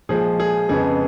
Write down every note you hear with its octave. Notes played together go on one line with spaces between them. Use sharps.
A#2 F3 G#3 G#4
G#4
F2 C#3 G#3 B3 G#4